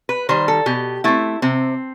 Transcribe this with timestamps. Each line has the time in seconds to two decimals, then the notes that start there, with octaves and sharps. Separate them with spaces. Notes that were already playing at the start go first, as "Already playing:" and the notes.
0.09 B4
0.29 D#3 G3 C5
0.48 A4
0.66 B2 G4
1.04 A3 C4 E4
1.42 C3 C4